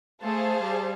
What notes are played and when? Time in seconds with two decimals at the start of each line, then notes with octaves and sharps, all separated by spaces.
0.22 A3 G#4 C5 F5 A5
0.63 G3